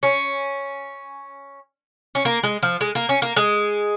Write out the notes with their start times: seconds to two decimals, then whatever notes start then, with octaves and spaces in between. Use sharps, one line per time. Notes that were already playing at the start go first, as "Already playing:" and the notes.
0.03 C#4
2.15 C#4
2.25 A#3
2.43 G#3
2.63 F3
2.81 G#3
2.95 A#3
3.09 C#4
3.22 A#3
3.36 G#3